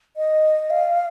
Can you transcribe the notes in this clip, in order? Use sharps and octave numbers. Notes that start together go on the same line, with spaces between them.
D#5
F5